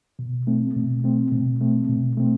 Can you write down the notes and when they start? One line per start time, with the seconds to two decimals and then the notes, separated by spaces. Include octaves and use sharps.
0.19 B2
0.47 A3 C4
0.76 B2
1.04 A3 C4
1.32 B2
1.61 A3 C4
1.89 B2
2.17 A3 C4